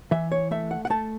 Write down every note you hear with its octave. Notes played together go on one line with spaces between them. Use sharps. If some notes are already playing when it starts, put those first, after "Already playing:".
E3 E5
C#5
A3 E5
F#5
F#5
A3 A5